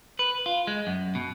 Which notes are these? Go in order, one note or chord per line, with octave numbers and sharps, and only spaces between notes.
B4
F4
G#3
F#2
B2